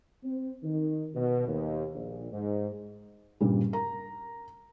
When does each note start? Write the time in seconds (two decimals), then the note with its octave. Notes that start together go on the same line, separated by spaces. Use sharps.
0.24 C4
0.63 D#3
1.15 B2
1.47 D#2
1.94 A#1
2.32 G#2
3.40 G2 A#2 C#3 G3
3.73 A#4 A#5